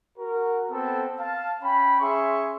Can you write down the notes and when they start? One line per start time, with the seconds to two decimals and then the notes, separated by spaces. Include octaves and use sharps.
0.18 F#4 A#4
0.71 B3 C4 A4
1.20 F5 A5
1.63 C#4 G5 B5
2.01 C#4 G#4 E5 C6 C#6